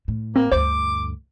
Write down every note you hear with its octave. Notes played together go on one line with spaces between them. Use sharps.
A2
A#3 C4
D2 G2 C5 D6